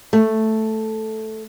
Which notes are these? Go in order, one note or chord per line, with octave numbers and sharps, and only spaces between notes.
A3